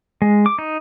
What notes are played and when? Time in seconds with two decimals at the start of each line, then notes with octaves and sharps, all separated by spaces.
0.22 G#3
0.46 D6
0.59 D#4